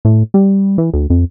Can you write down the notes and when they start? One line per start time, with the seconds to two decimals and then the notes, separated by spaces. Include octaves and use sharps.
0.05 A2
0.34 G3
0.78 E3
0.94 D2
1.10 F2